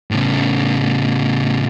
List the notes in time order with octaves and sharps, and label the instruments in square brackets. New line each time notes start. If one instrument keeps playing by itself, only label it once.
[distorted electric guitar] A2 C#3